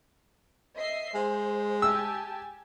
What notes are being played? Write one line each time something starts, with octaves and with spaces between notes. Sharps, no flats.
D#5 E5 C7
G#3 C5
G4 G#5 A5 E6